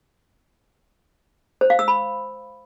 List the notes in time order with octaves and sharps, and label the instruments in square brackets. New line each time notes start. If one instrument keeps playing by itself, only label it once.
[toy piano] C5
F5
E6
B5